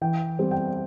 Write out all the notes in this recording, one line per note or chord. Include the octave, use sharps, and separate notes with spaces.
E3 G5
G3 C4
G5